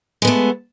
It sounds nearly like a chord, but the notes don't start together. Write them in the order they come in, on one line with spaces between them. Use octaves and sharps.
G#3 B3 A3